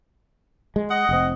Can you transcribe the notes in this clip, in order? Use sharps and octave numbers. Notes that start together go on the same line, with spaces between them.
G#3
D#5 F#5
F1 C4